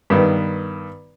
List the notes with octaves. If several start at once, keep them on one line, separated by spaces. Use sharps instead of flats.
G2 D#3 B3